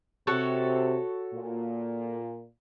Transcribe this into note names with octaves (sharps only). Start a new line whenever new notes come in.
C3 F#4 A4 C#5
A#2